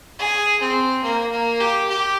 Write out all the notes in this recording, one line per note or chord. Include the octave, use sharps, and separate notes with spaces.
G#4
C4
A#3
A#3
G4
G4